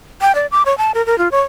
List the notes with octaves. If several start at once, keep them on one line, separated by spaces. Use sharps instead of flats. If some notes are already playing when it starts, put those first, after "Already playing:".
G5
D5
D6
C#5
A5
A#4
A#4
F4
C#5